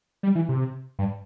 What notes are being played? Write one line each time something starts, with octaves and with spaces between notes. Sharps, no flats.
G3
E3
C3
G2